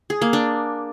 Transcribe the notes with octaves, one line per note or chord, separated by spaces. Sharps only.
G#4
A#3
D4